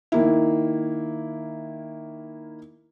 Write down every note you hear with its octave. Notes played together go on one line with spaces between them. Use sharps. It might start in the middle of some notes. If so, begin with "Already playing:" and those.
D#3 A#3 E4